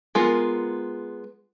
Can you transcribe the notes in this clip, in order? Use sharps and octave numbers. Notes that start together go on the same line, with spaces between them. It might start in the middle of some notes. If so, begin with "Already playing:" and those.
G#3 B3 F4 A#4